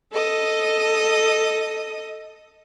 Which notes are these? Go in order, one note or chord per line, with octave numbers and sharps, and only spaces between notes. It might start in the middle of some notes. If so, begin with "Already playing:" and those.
A4 D#5 D#6